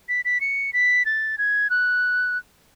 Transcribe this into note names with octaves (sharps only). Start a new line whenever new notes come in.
B6
B6
C#7
B6
A6
G#6
F#6